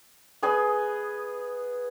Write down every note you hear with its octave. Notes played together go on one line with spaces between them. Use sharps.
B3 G#4 B4 D#5